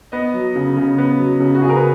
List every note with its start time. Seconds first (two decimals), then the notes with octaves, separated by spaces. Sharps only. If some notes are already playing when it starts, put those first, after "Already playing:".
0.12 B3 D#5
0.34 F#3
0.56 C#3
0.77 C#3
0.98 B3
1.19 F#3
1.40 C#3
1.55 F#4
1.62 C#3 G#4
1.69 A#4
1.76 B4